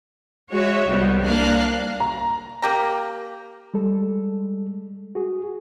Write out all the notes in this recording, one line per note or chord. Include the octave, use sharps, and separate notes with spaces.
G#3 F#4 C#5 E5
C2 G3 B3
C2 A#3 D4 F5 A#5 F#6
A#5
A#3 G4 A#5
G3 G#3 A4
F#4 G#4